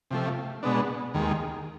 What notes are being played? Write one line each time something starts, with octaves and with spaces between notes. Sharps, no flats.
C3 F3 A3
B2 G#3 B3 D4
D#2 D#3 G#3